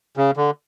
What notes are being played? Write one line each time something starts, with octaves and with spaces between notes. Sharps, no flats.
C#3
D3